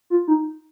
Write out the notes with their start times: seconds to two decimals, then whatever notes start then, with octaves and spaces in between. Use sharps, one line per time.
0.10 F4
0.28 D#4